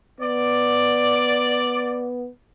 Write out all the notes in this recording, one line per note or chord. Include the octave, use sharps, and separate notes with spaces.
B3 D5